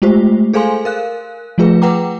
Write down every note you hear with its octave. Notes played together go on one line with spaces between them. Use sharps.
G#3 A3 F4 G4 C5
G#4 A4 C5 F5 G#5 C6
A#4 F5 F#6
F3 A3 F4 G#4 B4
B4 F#5 G5 A#5 D6